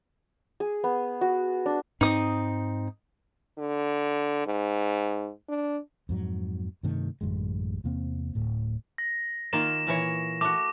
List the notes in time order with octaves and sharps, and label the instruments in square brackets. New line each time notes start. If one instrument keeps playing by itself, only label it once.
[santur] G#4
B3
F#4
D4
[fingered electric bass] G#2 C4 [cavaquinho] D#4 D#6
[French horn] D3
G#2
D4
[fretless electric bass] F2 G#2 F#3
G2 C3 D#3 A3
A1 F#2 D3 G#3
E2 C3 A#3 C4
D1 A2
[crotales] A#6
[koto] D#3 A#3 F4 [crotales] E7
[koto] A#2 E3 C#5
[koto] A3 F#4 [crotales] D6